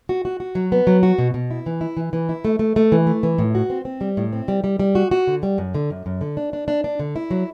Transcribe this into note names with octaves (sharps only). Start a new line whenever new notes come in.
F#4
F#4
F#4
F#3
B3
F#3
F#4
B2
B2
E4
E3
E4
E3
E3
E4
A3
A3
A3
E3
A3
E3
A2
F#4
C4
C4
G3
A2
C4
G3
G3
G3
F#4
F#4
D3
G3
F#2
D3
F#2
F#2
D3
D4
D4
D4
D4
D3
E4
F#3